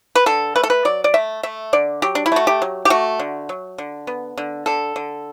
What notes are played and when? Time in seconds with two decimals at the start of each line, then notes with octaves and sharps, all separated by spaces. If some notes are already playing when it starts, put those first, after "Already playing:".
0.15 B4
0.26 D3 A4
0.55 A3 B4
0.63 A4
0.70 B4
0.85 F#3 D5
1.04 D5
1.14 A3 E5
1.43 A3 E5
1.73 D3 D5
2.02 F#3 G4
2.15 D4
2.26 E4
2.32 A3 F#4
2.47 G4
2.62 F#3
2.85 G4
2.90 A3 F#4
3.20 D3
3.49 F#3
3.78 D3
4.07 B3
4.38 D3
4.66 D3 A4
4.96 D3